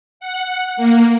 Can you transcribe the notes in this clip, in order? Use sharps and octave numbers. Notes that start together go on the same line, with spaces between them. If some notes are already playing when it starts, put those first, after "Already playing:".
F#5
A#3